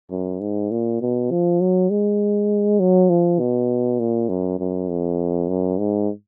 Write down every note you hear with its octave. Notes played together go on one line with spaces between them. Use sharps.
F#2
G#2
A#2
B2
F3
F#3
G#3
F#3
F3
B2
A#2
F#2
F#2
F2
F#2
G#2